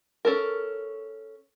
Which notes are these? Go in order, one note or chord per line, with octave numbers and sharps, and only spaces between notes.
C#4 A4 A#4